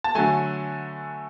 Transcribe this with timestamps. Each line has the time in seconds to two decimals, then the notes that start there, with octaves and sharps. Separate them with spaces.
0.04 A5
0.15 D3 F#3 A3 G#5